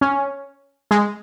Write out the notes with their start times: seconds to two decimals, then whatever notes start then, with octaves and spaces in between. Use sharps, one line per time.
0.01 C#4
0.91 G#3